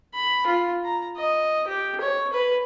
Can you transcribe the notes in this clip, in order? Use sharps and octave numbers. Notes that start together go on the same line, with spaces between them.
B5
F4
A#5
D#5
G4
C#5
B4